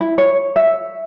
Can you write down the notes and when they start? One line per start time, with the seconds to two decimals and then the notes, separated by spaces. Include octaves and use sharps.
0.01 E4
0.18 C#5
0.56 E5